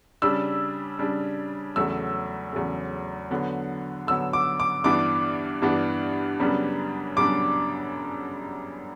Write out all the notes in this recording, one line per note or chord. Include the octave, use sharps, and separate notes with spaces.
C#3 G3 D4 E6
C#3 G3 D4
E2 C#3 F#3 A3 E6
E2 C#3 F#3 A3
D3 F#3 B3
D3 F#3 B3 E6
D6
D6
G2 E3 B3 D4 D6
G2 E3 B3 D4
F#2 C#3 G3 B3 D4
F#2 C#3 G3 B3 D4 D6